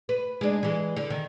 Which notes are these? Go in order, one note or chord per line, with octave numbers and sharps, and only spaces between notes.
B4
G#3 D4
E3 G#3
D3
D#3